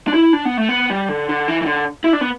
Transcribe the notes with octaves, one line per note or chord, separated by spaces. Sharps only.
D4
E4
D4
B3
A3
B3
G3
D3
D3
E3
E3
D3
E4
D4
B3